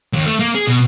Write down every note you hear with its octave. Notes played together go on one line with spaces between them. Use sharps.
D#2
A3
A#3
G#4
B2